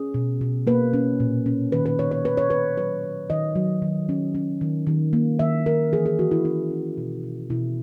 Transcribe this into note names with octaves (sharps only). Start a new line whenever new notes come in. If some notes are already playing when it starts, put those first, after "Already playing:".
Already playing: C#4 G#4
B2
B2
A#3 B4
C#4
A#2
C#4
D#3 B4
B4
C#4 C#5
C#5
D#3 B4
C#5
D#3 B4
F#3 B4
D#3
D#3 D#5
F#3
D#3
C#4
C#4
D#3
D#3
A#3
D#3 E5
D#3 A#4
E3 G#4
G#4
E3 F#4
E4
C#4 E4
C#4
B2
B2
B2 E4